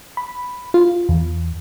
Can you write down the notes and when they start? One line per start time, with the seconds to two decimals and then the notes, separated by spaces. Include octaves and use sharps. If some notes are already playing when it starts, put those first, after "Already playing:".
0.17 B5
0.74 F4
1.09 E2